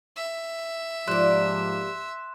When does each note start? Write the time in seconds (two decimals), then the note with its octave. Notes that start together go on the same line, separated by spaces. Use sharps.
0.16 E5
1.07 G#2 F3 G3 A#3 C6 F#6 E7